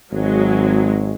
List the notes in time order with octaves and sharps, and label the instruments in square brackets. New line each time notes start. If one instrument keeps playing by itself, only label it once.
[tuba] G#1 [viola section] F#3 G#3